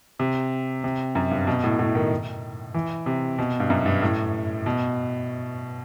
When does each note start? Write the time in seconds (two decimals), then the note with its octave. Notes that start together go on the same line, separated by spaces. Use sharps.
0.19 C3
0.84 C3
1.15 F#2
1.31 G2
1.47 B2
1.64 A2
1.79 A2
1.95 D#3
2.74 E3
3.06 C3
3.38 B2
3.60 G2
3.70 F#2
3.86 G2
4.02 A2
4.66 B2